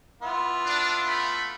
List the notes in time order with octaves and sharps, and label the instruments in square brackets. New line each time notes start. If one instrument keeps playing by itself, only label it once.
[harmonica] B3 E4 F4
[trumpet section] D4
A3 B5